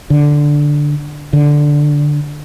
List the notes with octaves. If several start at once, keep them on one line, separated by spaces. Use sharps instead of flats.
D3
D3